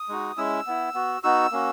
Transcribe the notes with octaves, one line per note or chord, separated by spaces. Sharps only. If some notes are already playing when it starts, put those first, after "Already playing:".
Already playing: D#6
G#3 D#4 F#4
G#3 C#4 E4 E6
B3 E4
B3 F#4
B3 D#4 F#4 E6
A#3 C#4 F#4